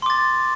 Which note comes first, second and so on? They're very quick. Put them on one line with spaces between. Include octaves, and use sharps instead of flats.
C6 D6 A6